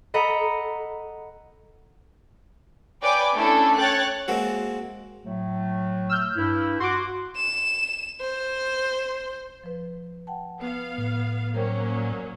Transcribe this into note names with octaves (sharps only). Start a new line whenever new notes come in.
A4 D#5 F#5 A#5 B5
B4 C#5 D5 G5 G#5 D6
A3 C#4 D4 E4 A4
C#5 G5 F#6 A6
G#3 A#3 C4 F#4
A2 F#3 A3
E6 F6 G6
G2 E4
F#4 C6 D6
E7
C5
F3 B4
F#5 G5 A5
B3 F5
A2
F#3 A#3 C#4 A#4 C5 G5
D5 A#5